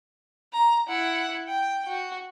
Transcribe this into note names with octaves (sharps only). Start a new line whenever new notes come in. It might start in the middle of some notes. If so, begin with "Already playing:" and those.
A#5
E4 F#5
G5
F#4